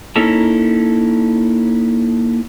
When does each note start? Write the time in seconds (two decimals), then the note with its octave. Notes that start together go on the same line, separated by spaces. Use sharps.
0.16 A#3 C#4 D#4 E4 A4 A#4